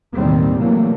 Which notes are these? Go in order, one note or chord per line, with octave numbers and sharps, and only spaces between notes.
A1 D#2 B2 D#3 G3 C4
C3 E3 F#3 G3 A3 A#3